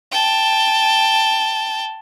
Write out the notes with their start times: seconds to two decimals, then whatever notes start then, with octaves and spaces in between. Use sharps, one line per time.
0.12 G5 A5